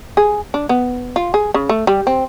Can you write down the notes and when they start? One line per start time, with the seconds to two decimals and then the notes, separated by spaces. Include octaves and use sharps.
0.17 G#4
0.54 D4
0.69 B3
1.16 F4
1.34 G#4
1.54 C#3
1.69 A3
1.87 G3
2.07 C4